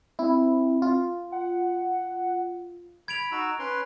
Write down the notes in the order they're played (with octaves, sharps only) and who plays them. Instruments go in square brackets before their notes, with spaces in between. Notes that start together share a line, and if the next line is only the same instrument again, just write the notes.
[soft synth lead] C4 [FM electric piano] E4
[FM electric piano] F4
[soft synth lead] F#5
[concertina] B5 [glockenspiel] G#6 D7 F7
[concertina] D#4 F#4 E6
C#4 B4 C6